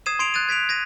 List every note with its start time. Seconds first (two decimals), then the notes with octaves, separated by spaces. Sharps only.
0.06 D#6 G#6 C7 D#7 E7
0.19 C6 G#6 C7 D7 F7
0.34 F#6 G#6 A6 D#7
0.49 G#6 B6 D7 F7
0.69 G#6 A#6 D#7